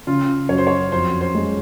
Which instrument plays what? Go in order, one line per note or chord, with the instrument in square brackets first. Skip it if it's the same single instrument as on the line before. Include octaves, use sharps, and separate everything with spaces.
[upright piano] C#3 [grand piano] F4
[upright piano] F#2 [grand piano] C#5
[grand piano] C5
C#5
[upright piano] F2 [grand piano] C5
[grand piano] C5
[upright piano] G#3